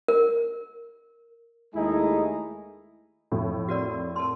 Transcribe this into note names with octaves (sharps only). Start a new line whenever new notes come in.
A#4
D#2 G#3 A3 D#4 E4 G#4
F2 A2
F#4 A#4 D5
A#4 A5 C6